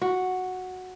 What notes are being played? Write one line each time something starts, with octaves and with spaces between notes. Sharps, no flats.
F#4